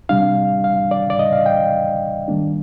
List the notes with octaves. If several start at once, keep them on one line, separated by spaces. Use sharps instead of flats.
C3 G3 D4 F5
F5
D5
D5
D#5
F5
G5
D#3 G3 A#3 D4